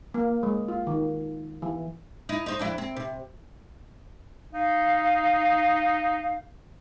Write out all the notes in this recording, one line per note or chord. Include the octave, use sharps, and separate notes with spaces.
A#3
G#3
F4
D#3
E3
D#4 E4
D#4 C5
F2 D4 E4
C4
C3
D#4 F5